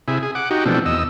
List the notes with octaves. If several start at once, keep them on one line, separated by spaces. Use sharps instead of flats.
C3 E4 G#4
G#4
F#5 D6
D#4 F#4 G4
B2 E3 F3 A3 C4 D4
E2 D#5 E6